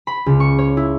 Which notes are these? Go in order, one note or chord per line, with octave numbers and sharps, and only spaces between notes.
B5
C#2
C#6
C#5
E4